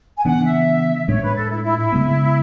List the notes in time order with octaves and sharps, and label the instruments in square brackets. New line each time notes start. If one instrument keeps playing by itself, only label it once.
[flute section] G#5
[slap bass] C#3 E3 B3 D4 [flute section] F#5
[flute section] E5
[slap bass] A2 G#3 D4 [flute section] C#5
[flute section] B4
A4
E4
E4
E4
[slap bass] C#3 G#3 B3